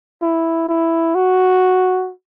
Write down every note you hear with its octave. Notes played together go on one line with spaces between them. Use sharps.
E4
E4
F#4